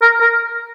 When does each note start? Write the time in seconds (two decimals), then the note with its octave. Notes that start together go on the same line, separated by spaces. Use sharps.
0.02 A#4
0.20 A#4